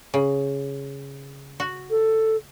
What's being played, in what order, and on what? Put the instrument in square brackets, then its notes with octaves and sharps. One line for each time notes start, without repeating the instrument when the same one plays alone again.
[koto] C#3
F#4
[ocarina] A4